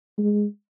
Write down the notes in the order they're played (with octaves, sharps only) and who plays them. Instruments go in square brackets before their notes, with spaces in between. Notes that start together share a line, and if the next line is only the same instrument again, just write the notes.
[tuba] G#3